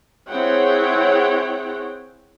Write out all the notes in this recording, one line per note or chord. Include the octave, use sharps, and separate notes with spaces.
C4 E4 G#4 C#5 F#5 G5